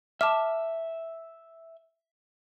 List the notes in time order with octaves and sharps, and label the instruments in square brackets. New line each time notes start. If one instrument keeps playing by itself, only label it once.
[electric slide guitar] E5 [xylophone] A5 D6 F6